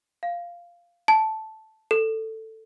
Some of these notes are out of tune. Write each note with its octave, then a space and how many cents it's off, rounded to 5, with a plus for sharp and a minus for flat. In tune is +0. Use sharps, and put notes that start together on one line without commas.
F5 -5
A5 -5
A4 +10